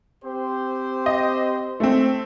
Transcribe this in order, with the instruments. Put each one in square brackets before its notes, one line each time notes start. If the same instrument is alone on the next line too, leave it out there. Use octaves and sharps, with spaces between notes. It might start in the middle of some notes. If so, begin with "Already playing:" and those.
[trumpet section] C4 G4 C5
[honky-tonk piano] D#5
A3 C4